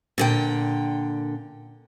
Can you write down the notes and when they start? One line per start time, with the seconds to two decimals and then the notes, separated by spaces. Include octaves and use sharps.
0.18 A#2 D3 G5